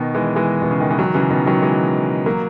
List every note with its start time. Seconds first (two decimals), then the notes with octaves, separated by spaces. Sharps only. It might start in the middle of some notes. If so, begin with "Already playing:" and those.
Already playing: B2 D#3
0.15 E3 G#3
0.36 E3 G#3
0.62 B2
0.71 C#3
0.80 D#3
0.90 E3
0.99 D#3 F#3
1.14 C#3 E3
1.30 B2 D#3
1.46 D#3 F#3
1.62 E3 G#3
2.26 F#3 A#3